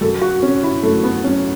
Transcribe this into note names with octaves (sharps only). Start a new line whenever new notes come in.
F#2 A4
F#4
F#3 C#4
E4
F#2 A3
B3
F#3 C#4